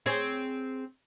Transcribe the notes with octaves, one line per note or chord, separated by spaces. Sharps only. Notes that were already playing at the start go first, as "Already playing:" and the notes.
C4 G#4 C#5